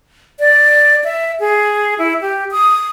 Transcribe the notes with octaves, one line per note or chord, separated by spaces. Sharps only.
D5
E5
G#4
E4
G4
D#6